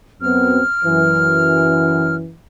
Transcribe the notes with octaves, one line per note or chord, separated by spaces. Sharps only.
F#2 B3 C4 F6
F#2 E3